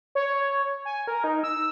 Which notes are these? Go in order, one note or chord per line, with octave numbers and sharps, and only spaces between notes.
C#5
G#5
A#4
D#4
E6